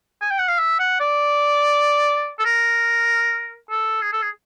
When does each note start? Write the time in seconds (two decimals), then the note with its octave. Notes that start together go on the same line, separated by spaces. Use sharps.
0.21 G#5
0.30 G5
0.39 F#5
0.48 F5
0.59 E5
0.79 F#5
1.00 D5
2.39 A4
2.45 A#4
3.70 A4
4.02 G#4
4.13 A4
4.22 G#4